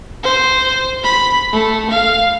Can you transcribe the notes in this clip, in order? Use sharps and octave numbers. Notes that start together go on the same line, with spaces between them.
C5
B5
A3
F5